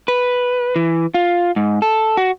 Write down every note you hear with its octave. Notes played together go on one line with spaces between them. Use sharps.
B4
E3
F4
G#2
A4
F#4